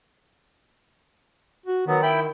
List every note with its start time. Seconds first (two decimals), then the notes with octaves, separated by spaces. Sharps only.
1.66 F#4
1.87 D#3 F#3 B3
2.02 E4 G5 B5